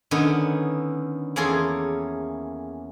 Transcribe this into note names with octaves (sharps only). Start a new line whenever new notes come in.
D3 D#3 B3 C#4 D#4
E2 A#3 C#4 G#4 A4 C6